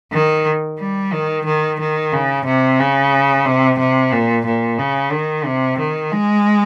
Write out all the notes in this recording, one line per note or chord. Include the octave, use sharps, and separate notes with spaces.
D#3
G3
D#3
D#3
D#3
C#3
C3
C#3
C3
C3
A#2
A#2
C#3
D#3
C3
D#3
G#3